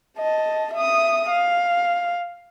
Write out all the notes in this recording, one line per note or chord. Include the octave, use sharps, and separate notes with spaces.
D#5 A5
E5 D#6
F5